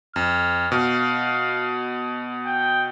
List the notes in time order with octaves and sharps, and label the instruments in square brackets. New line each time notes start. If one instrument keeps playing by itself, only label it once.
[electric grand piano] F2 [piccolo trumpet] F6
[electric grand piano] B2 [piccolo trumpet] F5
[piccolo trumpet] G5